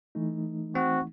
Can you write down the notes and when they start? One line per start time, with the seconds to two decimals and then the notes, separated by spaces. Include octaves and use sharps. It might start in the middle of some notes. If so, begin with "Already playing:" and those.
0.15 E3 A3 D#4
0.75 C4 F#4